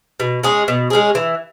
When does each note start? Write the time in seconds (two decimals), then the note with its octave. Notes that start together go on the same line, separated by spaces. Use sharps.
0.20 B2
0.43 G#3 C#4 G#4
0.68 B2
0.90 G#3 C#4 G#4
1.15 E3